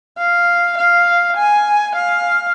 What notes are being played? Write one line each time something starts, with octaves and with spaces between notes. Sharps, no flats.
F5
F5
G#5
F5